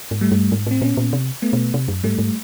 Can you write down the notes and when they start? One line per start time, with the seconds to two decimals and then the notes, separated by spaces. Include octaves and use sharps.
0.11 G#2
0.21 G3 A3
0.32 G2
0.52 G#2
0.66 A2 C4
0.81 A#2 B3 C#4
0.97 A#2
1.13 C3
1.42 A3 B3
1.53 B2
1.74 C3
1.88 F#2
2.03 G#2 G3 A3
2.18 G#2